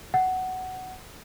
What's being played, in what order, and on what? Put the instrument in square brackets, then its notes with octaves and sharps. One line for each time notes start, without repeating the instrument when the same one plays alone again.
[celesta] F#5